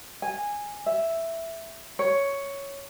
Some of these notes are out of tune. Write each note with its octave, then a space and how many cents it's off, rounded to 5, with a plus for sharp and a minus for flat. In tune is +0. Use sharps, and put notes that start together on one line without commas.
G#5 -10
E5 +5
C#5 +5